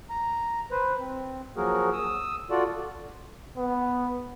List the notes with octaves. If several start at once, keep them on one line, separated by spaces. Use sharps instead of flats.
A#5
B4 C5
C4
F3 F#3 A#3 F#4 G#4 A#4
D#6 E6
F4 F#4 A4 D5
B3